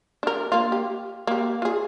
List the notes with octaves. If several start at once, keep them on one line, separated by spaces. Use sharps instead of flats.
D4 A#4
A#3 F4
G4
A#3 G4
F4 G#4